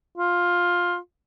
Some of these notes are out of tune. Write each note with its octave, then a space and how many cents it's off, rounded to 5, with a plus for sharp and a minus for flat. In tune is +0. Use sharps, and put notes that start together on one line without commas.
F4 +10